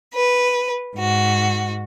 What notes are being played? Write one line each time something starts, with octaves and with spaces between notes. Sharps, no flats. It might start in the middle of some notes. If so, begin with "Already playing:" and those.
B4
G#2 F#4